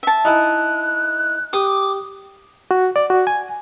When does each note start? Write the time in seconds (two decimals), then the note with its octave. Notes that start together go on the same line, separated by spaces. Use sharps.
0.03 E5 A5
0.25 D#4 E4 G#5 F#6
1.53 G4 D6 D#6
2.71 F#4
2.96 D5
3.10 F#4
3.27 G#5